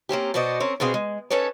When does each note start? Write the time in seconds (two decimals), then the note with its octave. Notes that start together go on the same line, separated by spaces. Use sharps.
0.09 A#3 C4 C#4 G4
0.34 B2 B3 F#4 C5 D5 D#5
0.60 C4 C#4 A#4
0.80 B2 B3 C4 G#4 F5
0.94 G#3
1.30 C#4 D#4 A4 B4 C#5